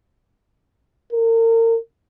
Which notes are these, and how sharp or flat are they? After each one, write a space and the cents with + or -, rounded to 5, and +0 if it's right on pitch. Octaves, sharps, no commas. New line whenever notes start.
A#4 -35